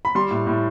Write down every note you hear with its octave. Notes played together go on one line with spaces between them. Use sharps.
B5
G3 C6
A2
A2